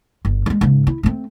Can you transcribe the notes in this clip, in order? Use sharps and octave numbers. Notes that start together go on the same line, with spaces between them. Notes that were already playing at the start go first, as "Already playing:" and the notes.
G1
F#3 G#3
G#2 C#3
E4
A3 C4